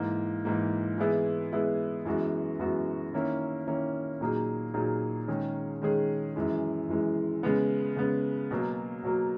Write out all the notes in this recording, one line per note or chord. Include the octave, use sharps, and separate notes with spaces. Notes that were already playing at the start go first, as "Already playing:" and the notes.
Already playing: G#2 E3 A#3
G#2 E3 A#3
E3 G#3 B3 E4 G#4
E3 G#3 B3 E4 G#4
F#2 E3 G#3 B3 F#4
F#2 E3 G#3 B3 F#4
D#3 A#3 C#4 E4 A#4
D#3 A#3 C#4 E4 A#4
A#2 F#3 A#3 D#4 G#4
A#2 F#3 A#3 D#4 G#4
D#3 G#3 C#4 G#4
D#3 G#3 C#4 G#4
F#2 E3 G#3
F#2 E3 G#3
C#3 G#3 B3
C#3 G#3 B3
B2 F#3 A#3
B2 F#3 A#3